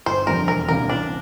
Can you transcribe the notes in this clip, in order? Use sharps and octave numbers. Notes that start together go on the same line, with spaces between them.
G1 C5
F2 D3 G3 C4 A#4
E1 A#4
D2 C3 G3 A#3 A#4
A1 D4